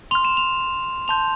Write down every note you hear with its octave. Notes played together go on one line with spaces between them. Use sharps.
C6 F6 F7
E7
F7
A5 C6 G6 F7